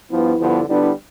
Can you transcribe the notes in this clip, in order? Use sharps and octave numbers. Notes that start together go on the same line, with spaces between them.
G2 F3 B3 E4
G2 D3 F3 B3
D3 G3 B3 D4 E4
F4
E4